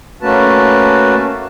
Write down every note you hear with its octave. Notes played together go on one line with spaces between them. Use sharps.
A3 A#3 C#4 F#4 B4 A5